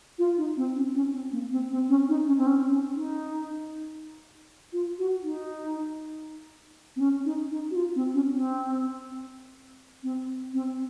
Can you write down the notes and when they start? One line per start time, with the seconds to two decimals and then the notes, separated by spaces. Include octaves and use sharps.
0.18 F4
0.38 D#4
0.57 C4
0.75 C#4
0.95 C#4
1.13 C4
1.32 A#3
1.51 C4
1.71 C4
1.89 C#4
2.09 D#4
2.27 C#4
2.38 C4
2.47 C#4
2.71 C#4
2.96 D#4
4.73 F4
4.99 F#4
5.23 D#4
6.96 C4
7.00 C#4
7.25 D#4
7.51 D#4
7.71 F#4
7.76 F4
7.96 C4
8.14 C#4
8.33 C4
10.03 C4
10.54 C4